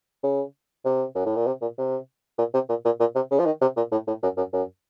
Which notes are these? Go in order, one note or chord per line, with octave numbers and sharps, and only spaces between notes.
C#3
C3
F#2
A2
A#2
C3
A#2
C3
A#2
C3
A#2
A#2
A#2
C3
C#3
F3
D#3
C3
A#2
A2
A2
F#2
F#2
F#2